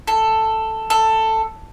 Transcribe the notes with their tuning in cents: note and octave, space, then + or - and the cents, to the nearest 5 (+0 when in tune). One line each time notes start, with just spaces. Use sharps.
A4 +5
A4 +10